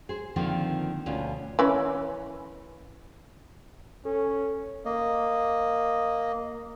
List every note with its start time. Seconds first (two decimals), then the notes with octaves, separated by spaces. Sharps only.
0.09 G#4 C5
0.36 D3 D#3 F3 A#3 C4
1.06 D2 B2 C#4 F4
1.59 E3 C#4 E4
4.05 C#4 A4
4.85 A#3 D#5